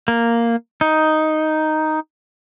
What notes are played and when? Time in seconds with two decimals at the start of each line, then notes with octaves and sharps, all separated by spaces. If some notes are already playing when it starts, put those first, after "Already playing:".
0.08 A#3
0.81 D#4